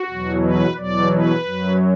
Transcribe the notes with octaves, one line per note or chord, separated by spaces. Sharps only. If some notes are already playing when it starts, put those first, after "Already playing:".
Already playing: F#4
E2 B2 F#3
B4
E2 B2 F#3 D5
B4
F#2 F#3